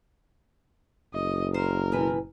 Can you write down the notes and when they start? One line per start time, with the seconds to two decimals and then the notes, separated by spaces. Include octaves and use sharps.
1.14 F#1 D#5
1.54 A#4 C5
1.92 B2 E3 B4